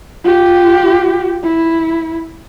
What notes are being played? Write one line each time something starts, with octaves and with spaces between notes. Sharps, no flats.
F4 G4
E4